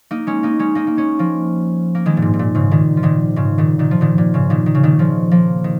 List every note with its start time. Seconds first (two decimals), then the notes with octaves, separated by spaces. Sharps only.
0.11 A#3 D#4
0.27 G#3 C#4
0.43 A#3 D#4
0.59 G#3 C#4
0.75 A#3 D#4
0.87 A#3
0.97 G#3 C#4
1.19 F3 A#3
1.95 A#3
2.06 D#3 G#3
2.17 A#2
2.22 G#2
2.34 G#2
2.39 A#2
2.55 G#2 C#3
2.71 A#2 D#3
2.97 F3
3.03 A#2 D#3
3.36 G#2 C#3
3.58 A#2 D#3
3.79 A#2 D#3
3.91 F3
4.01 A#2 D#3
4.18 A#2
4.34 G#2 C#3
4.50 A#2 D#3
4.66 D#3
4.75 C#3
4.83 A#2 D#3
4.99 C#3 F3
5.31 F3 A#3
5.64 D#3